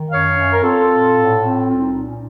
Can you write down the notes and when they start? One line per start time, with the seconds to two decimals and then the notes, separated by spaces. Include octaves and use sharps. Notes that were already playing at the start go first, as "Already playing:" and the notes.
Already playing: D#3
0.11 F#2 C#5 F5
0.37 F#2
0.53 A#4
0.63 C4 F4 A4
0.89 A#2
1.15 A2
1.42 C4
1.68 C2 C#4 F4
1.81 D#4
1.95 A#2 D#4
2.07 C#4